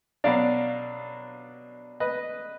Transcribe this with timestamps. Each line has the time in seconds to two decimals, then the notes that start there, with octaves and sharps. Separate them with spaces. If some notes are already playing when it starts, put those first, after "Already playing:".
0.24 B2 F#3 D4 D5 F5
2.00 B4 D#5